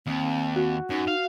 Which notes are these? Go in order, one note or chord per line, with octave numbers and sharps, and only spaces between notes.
D#2 C4
F#4
F#2 D#4
F5